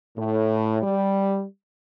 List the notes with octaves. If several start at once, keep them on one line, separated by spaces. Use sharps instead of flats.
A2
G3